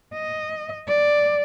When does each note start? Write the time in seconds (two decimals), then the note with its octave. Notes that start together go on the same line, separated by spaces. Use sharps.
0.14 D#5
0.88 D5